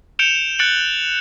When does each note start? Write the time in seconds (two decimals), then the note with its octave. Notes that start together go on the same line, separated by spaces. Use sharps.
0.19 G6 C#7 D7 E7 F7 G7
0.59 F#6 A6 C#7 D7 F#7